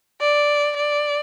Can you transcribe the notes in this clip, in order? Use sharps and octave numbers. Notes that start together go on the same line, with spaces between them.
D5
D5